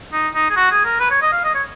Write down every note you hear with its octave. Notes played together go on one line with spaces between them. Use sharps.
D#4
D#4
G#4
F#4
G#4
A#4
B4
C#5
D#5
F5
D#5
C#5